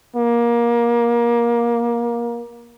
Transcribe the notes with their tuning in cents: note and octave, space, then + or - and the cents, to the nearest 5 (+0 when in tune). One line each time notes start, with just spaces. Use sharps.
A#3 +20